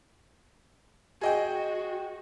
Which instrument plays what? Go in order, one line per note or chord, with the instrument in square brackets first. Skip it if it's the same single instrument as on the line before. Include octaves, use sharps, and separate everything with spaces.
[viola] F#4 [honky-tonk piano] G#4 D#5 G5